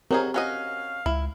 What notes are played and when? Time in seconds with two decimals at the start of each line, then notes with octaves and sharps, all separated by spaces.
0.11 F#3 C4 D#4 G4 G#4 A#4
0.34 C#4 F#4 D#5 F5
1.06 C#2 E4